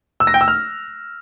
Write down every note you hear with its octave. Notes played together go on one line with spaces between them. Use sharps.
E6
A#6
G5
E6
F6